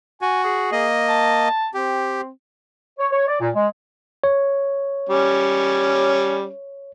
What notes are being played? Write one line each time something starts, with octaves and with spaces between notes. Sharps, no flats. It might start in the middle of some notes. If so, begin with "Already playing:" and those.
F#4 G#5
G#4
A#3 D#5
A5
C4 G4
C#5
C#5
D5
A#2
G#3
C#5
G3 C#4